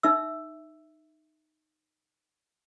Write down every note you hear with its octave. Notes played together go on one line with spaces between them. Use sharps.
D#4 E5 E6